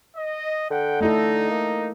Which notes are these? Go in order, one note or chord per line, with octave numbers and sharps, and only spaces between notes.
D#5
D3 F#5 G5
A3 D#4 E4 A4
A#3